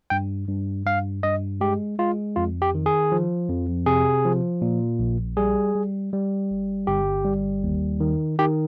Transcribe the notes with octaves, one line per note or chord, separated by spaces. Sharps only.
G2 G5
G2
G2 F5
G2 D#5
G#3 G4
G#3 F4
F2 F4
G4
D#3
G#4
F3
F2
C3 G#4
F3
A#2
A#1
G3 G#4
G3
G3
G1
G1 G4
G3
D#2
D#3
D#3 G4